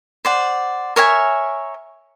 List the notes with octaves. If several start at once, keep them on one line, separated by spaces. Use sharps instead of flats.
C5 D5 F#5
A#4 C#5 E5 G#5